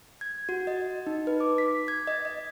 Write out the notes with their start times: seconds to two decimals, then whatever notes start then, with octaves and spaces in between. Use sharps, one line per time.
0.21 G#6
0.49 F#4
0.67 D#5
1.07 D#4
1.27 B4
1.41 D6
1.58 B6
1.88 G#6
2.07 D#5
2.25 D#5